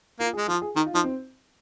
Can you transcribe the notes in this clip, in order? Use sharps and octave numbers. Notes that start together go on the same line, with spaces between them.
A#3 F4
G#4
G#3
F3 F4
G#4
D#3 D#4
F4
F3 D#4
C4